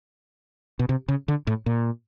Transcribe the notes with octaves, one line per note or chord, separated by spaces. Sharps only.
B2
C3
C#3
D3
A2
A#2